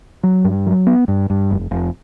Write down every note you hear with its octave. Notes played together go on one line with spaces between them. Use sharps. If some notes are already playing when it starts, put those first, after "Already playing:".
F#3
G2
F#3
B3
G2
G2
F1
F1